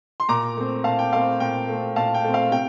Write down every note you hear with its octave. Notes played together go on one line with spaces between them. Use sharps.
C6
A#2 A#5 D6
A3 C4
A#2 F5 A5
G5
A3 C4 F5
A#2 G5
A3 C4
A#2 F5 A5
G5
A3 C4
F5
C3 G5